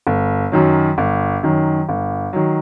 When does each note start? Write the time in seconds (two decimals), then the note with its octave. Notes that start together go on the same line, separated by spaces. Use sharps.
0.07 G1
0.52 F#2 D#3 F#3
0.98 G1
1.43 F#2 D#3 F#3
1.89 G1
2.33 D#3 F#3